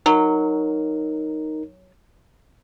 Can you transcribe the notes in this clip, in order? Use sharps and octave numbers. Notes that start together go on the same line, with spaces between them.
F#3 D#4 A#4